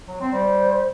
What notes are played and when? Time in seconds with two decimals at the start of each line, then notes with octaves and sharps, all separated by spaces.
0.08 F#3
0.21 C4
0.32 G3 C5